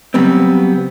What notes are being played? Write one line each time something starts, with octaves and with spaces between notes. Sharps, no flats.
C#3 F#3 G3 B3 C4